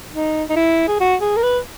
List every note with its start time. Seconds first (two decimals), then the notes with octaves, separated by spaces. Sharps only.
0.13 D#4
0.49 D#4
0.56 E4
0.88 G#4
1.00 F#4
1.21 G#4
1.37 A#4
1.43 B4